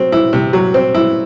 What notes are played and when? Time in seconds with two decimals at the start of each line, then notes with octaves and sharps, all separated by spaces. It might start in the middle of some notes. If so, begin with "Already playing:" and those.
Already playing: F#3 C4
0.12 E4
0.33 C3
0.53 F#3
0.74 C4
0.95 E4